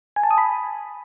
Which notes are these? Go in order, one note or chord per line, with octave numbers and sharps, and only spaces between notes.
G#5
A5
D#6
B5